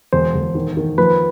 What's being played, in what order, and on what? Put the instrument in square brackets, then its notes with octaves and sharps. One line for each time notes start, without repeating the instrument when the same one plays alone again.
[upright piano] E1 [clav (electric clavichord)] C5
[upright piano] E1
D#3
D#3
[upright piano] F3 [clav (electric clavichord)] B4